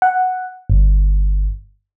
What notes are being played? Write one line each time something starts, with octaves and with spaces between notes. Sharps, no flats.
F#5
G1